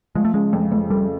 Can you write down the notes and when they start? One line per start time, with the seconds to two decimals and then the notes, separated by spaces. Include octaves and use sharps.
0.15 F3 G#3
0.25 A3
0.34 C#3 G#3
0.53 F2
0.72 F2
0.90 G3 A3